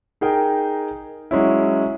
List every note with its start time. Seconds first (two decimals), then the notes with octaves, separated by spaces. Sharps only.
0.21 D#4 G#4 A#4 G5
1.31 F#3 G#3 C#4 E4